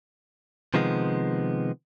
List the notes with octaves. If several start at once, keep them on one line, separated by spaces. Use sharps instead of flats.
C3 D#3 F3 G#3 B3